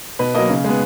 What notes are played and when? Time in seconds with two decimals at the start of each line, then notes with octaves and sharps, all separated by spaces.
0.19 B2 B4
0.34 F#3 A#3 D#5
0.50 C#3
0.64 G#3 B3